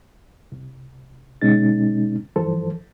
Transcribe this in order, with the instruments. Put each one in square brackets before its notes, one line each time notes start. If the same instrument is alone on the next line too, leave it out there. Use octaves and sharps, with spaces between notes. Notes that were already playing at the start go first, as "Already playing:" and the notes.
[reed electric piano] C2
D2 B2 G#3 C#4 D#4 A6
G2 E3 F3 A4 C5